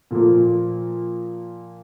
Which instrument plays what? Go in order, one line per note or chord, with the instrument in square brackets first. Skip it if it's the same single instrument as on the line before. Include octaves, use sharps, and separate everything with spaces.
[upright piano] A#2 F3 A#3